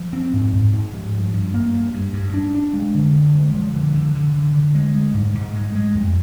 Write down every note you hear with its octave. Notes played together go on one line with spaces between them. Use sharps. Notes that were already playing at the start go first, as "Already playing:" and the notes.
Already playing: F3
C4
G#2
G#2
G#2
F3
G2
G2
A#3
G2
G2
G2
D4
D4
G#3
D3
D3
G#3
F3
D3
D3
D3
D3
D3
G#3
G#3
G#2
G#2
G#3
G#3
F2